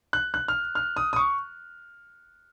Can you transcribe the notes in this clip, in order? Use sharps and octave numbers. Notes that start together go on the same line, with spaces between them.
F#6
F#6
F6
F6
D#6
D#6
C#6